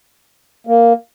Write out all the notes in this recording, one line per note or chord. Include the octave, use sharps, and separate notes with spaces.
A#3